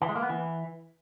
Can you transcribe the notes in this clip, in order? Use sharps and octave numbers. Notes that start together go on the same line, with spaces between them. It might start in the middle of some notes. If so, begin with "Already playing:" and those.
E3
G#3
A#3
B3
E3